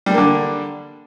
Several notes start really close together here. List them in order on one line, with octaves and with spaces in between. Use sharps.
G3 D4 A#3 D3